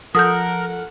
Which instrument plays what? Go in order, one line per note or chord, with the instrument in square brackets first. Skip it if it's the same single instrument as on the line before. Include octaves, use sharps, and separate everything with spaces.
[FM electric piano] F3 A4 F6 [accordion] A#4 [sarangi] F#5 [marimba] D#6 G6